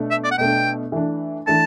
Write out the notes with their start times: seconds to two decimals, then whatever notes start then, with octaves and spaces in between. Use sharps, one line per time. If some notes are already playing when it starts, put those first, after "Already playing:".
Already playing: B2 A3 D4
0.11 E5
0.24 D5
0.31 F#5
0.38 B2 A3 D4 G5
0.92 E3 A3 D4
1.47 E3 A3 D4 A5